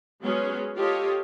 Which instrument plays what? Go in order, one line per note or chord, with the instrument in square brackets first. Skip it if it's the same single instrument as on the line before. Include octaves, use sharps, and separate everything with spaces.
[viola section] F#3 G#3 B3 C#4 F#4 G#4
F4 G4 A4 C#5 D#5